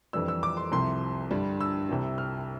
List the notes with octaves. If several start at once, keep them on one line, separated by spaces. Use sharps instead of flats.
F2 E3 G3 D4 E6
E6
D6
C6
C2 C3 F3 C6
G2 D3 G3
E6
C2 C3 G3
F6